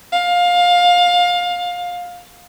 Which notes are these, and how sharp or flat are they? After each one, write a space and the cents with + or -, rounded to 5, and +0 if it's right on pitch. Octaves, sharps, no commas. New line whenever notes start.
F5 +20